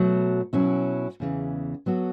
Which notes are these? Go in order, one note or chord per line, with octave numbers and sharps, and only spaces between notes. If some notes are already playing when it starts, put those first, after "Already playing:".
Already playing: B2 F#3 A3
B2 F#3 C#4 E4
E2 C#3 E3
F#3 B3 F#4 A4